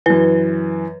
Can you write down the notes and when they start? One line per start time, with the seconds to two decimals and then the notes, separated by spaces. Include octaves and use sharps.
0.06 F#2 E3 B4